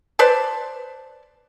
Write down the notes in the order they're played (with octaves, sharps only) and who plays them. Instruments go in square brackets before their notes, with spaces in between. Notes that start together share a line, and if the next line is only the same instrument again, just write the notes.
[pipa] B4 C5 D5 A5